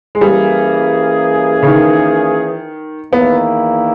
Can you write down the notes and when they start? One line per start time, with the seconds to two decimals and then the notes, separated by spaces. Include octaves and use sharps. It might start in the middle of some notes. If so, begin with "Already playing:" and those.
0.15 G#3
0.20 E3 G3 A#3 C#4 G#4
1.63 C#3
1.66 D#3
3.12 E2 D#3 A#3 B3 E4